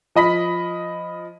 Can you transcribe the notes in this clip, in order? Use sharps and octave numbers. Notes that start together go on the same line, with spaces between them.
F3 D#5 B5 B6